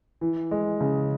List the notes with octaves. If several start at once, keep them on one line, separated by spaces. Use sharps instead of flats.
E3
G#3
C#3